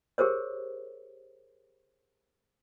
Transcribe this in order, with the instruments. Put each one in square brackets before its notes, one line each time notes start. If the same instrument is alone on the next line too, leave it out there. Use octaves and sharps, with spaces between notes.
[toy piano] G4 G#4 A#4 C5 C#5